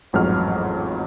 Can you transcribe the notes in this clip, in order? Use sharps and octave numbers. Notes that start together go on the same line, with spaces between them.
A1 F2 G#2 F#3 F6